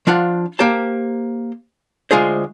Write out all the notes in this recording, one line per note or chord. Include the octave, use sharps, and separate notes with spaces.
F3 D4 F4 F#5
A#3 G4 C5 A5
D2 G#3 F4 G#4 C5